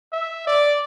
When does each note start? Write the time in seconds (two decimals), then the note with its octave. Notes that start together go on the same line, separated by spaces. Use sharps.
0.13 E5
0.47 D5